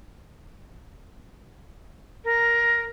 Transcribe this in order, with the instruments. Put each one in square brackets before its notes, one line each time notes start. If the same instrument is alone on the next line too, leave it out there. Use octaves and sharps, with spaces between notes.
[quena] A#4